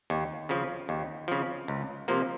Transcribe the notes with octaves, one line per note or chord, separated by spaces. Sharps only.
D#2
C#3 F3
D#2
C#3 F3
C#2
C3 F3 A#3